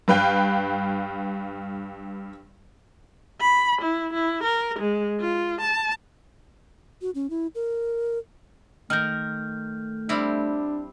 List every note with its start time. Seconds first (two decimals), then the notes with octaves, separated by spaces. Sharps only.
0.08 G2 B4 F5 G5
3.41 B5
3.82 E4
4.13 E4
4.44 A#4
4.79 G#3
5.20 F4
5.61 A5
7.02 F#4
7.15 C#4
7.30 E4
7.55 A#4
8.90 D#3 A3 A#4 F6 G6
10.09 G3 C4 D4 E4